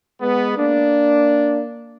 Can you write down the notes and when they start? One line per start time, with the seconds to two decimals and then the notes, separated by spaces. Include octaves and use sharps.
0.21 G#3 B3
0.57 A#3 D4